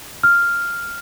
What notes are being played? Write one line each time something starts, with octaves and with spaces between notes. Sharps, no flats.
F6